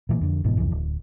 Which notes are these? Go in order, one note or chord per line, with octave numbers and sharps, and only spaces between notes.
A#2 E3 F3 A#3
F2 D3
F#1 G#2 B2 E3
C2 F2 E3
D1